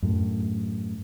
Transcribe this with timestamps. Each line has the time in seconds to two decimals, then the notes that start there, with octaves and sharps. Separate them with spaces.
0.02 F#2 A2